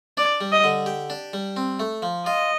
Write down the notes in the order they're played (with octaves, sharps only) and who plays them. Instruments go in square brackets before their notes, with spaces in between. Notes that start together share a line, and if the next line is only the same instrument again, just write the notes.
[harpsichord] D4 [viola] D5
[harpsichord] G3
[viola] D#5
[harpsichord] D3
G4
D4
G3
C4
A3
F3
[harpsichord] F4 [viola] D#5